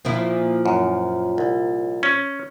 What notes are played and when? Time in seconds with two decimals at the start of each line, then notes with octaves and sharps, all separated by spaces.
0.05 A#2 F3 E4
0.66 F#2
1.38 C2
2.03 C#4